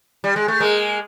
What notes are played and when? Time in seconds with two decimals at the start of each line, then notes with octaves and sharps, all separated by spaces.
0.24 G3
0.36 G#3
0.48 A3
0.60 G#3 A#3